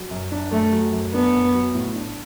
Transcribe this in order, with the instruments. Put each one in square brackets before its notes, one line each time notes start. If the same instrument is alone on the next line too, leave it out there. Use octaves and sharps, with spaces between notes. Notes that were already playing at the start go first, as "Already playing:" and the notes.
Already playing: [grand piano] F#3
F#2
D4
[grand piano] F#2 [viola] A3
[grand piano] F#3
F#2
[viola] B3 [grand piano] D4
[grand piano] F#2
F#3
A2
D4